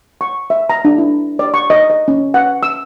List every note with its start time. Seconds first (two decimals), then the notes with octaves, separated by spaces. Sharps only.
0.21 C#6
0.50 E5
0.69 A#5
0.85 D4
0.98 E4
1.39 D5
1.54 C#6
1.70 D#5
1.90 D#5
2.08 C#4
2.34 F#5
2.63 E6